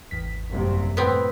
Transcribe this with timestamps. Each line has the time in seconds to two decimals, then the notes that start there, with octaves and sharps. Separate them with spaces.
0.11 G#1 E2 B6
0.48 F#1 C2 C3
0.97 A2 B3 C4